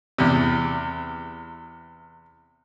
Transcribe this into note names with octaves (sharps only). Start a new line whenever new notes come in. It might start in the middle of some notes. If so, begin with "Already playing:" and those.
E2 C3